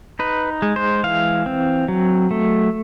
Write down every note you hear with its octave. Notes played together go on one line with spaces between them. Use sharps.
D#4 B4
G#3
C5
E3 F5
C4
F#3
A3